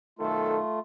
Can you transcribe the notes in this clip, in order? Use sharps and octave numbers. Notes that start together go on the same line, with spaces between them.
B1 D#3 A3 F4 A4